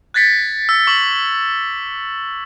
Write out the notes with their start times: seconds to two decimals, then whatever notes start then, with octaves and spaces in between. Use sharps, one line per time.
0.14 F#6 G#6 A6 B6 C#7
0.69 E6
0.87 C#6 D6 F#7